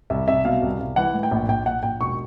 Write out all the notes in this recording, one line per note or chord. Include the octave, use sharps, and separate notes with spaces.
C2 E5
C2 E5
B2 F5
C2
C2
E3 F#5
A2
G5
A#1
A#1 G5
A#1 F#5
A#1 G5
E1 C#6